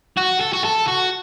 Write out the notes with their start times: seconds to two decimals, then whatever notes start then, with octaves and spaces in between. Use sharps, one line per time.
0.17 F#4
0.40 A4
0.53 F#4
0.64 A4
0.87 F#4